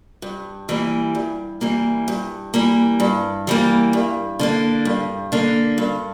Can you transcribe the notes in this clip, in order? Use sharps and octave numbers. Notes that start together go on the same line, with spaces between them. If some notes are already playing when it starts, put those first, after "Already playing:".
G2
E3 G3 A#3
G2
E3 G3 A#3
G2
E3 G3 A#3
G2
E3 G3 A#3
G2
D3 A#3 D4
G2
D3 A#3 D4
G2